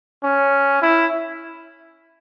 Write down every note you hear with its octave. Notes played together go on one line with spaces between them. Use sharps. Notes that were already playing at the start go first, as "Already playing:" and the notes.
C#4
E4